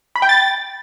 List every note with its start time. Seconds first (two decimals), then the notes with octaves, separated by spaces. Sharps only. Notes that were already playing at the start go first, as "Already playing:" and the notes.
0.16 B5
0.22 G5
0.29 A6